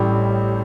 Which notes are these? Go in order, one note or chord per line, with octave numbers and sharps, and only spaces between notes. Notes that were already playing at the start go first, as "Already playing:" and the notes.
Already playing: A1 A2 G3 B5